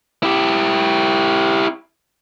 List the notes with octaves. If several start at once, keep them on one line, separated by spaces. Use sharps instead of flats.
E4 G4